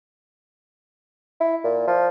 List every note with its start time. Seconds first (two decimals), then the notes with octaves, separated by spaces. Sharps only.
1.40 E4
1.64 A#2
1.87 F3